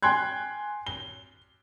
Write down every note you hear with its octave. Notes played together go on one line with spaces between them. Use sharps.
G5 G#5 C6 F#6 G#6
G7